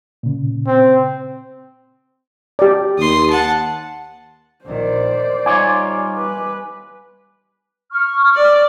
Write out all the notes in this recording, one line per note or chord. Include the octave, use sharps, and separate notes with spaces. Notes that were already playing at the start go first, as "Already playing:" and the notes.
A#2 C#3
C4
G4 D5
D#2 C6 D#6
F#5 A5
A#1 D#3 C5 D5
G3 D#4 F4 C#5 G#5 D6
B4
C#6 F6
D5